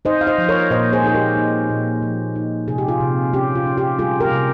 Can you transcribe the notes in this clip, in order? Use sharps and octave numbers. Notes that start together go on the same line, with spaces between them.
D#4 C5 D#5
F5
C5 D#5
F3
A#4 C#5
A#2 C5 D#5
G#4 C5
D#4 G#4
G4 A#4
D#4
A#2
F3
D#4
C3 G#4
G4
F4 G#4
C3
C#4 G4
F4
C#4
G4
G3 F4 G#4
G4 A#4
C3